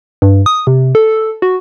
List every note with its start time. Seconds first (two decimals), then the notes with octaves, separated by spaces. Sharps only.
0.22 G2
0.46 D#6
0.67 C3
0.95 A4
1.42 F#4